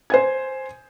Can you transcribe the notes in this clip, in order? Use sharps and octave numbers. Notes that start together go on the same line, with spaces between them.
C5 G#5 G#6